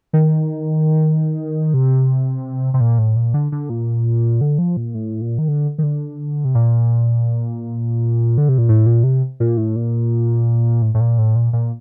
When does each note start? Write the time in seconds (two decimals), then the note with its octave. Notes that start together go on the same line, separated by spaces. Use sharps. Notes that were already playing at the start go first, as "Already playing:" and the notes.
0.13 D#3
1.74 C3
2.74 C3
2.81 A#2
2.99 A2
3.16 A#2
3.34 D3
3.52 D3
3.70 A#2
4.41 D3
4.58 F3
4.77 A#2
4.94 A2
5.21 A#2
5.38 D#3
5.48 D3
5.78 D#3
5.83 D3
6.45 C3
6.55 A#2
8.38 D3
8.49 C3
8.58 A#2
8.69 A2
8.86 A#2
9.04 C3
9.40 A#2
9.57 A2
9.76 A#2
10.82 A2
10.94 A2
11.00 A#2
11.18 A2
11.36 A#2
11.53 A#2